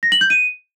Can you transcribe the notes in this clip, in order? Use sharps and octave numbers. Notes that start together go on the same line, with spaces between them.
A#6
F#7
G6
D#7